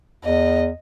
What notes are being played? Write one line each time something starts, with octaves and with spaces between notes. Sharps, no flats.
E2 D#5